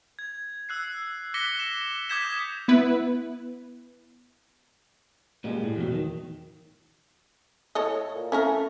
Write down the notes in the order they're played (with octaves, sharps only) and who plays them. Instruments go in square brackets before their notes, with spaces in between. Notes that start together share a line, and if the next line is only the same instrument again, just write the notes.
[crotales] G#6
E6 F#6 C7
D6 F#6 A#6 B6 C#7 G7
E7
D6 D#6 G6 G#6 B6 E7
[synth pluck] B3 E4 B4
[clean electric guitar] A#2 G3 G#3
A2
E2 B2 D#3 F#3
D#3
[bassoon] A2 [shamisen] A4 C#5 D#5
[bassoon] A#2
[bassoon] A3 [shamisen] C#4 E4 A#4